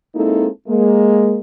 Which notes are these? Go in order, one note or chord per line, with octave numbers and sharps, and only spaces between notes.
G#3 A#3 C4 D#4 E4 A4
G#3 A#3